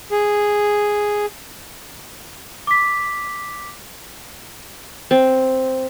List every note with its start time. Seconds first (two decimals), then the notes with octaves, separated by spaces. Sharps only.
0.11 G#4
2.67 D6 B6
5.11 C4